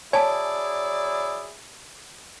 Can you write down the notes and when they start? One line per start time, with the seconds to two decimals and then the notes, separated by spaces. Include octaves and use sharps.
0.13 F#3 E4 G#4 C#5 D5 G#5 A5